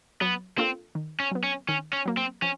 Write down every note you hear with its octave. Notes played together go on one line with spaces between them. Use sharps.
F#3 B3
A#3 C4 D4 F4 A4
D#3
C#4
F#3 B3
C#4
D#3 C#4
C#4
F#3 A#3
C4
F3 C#4